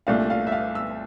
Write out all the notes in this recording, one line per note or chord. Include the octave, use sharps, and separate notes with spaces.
C2 A#2 A3 D4 F5
F5
E5
F5
E6